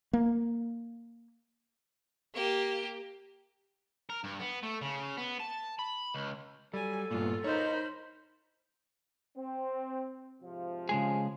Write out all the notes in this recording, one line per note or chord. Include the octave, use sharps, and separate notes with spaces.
A#3
A#3 G4
A#4
G2
B3
A3
C#3
B3
A5
B5
C#2
F#3 G3 A4 G#5
G2 A#2 B3 F4
D#4 A#4 C5 C#5 D#5 B5
C4
G#2 C3 F3
C#3 G#3 G#4